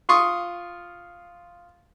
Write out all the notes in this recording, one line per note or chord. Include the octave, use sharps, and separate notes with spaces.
F4 C6 C#6 D#6